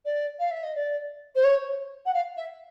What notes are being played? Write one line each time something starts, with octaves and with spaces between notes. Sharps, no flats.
D5
F5
E5
D#5
D5
C5
C#5
F#5
F5
E5